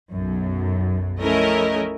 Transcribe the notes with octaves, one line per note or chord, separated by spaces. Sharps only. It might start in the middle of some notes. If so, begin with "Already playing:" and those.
B1 F#2
F3 A3 C#4 E4 A#4 D#5